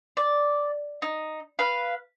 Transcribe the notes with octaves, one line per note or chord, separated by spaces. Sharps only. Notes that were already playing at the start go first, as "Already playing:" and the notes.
D5
D#4
B4 F5